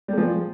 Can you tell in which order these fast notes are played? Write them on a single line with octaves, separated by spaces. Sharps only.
G3 G#3 F3